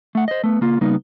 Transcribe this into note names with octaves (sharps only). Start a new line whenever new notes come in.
A3 F#5
C5 D#5
A3 B3
C#3 A#3 F4
C#3 G3 A#3 B3 D#4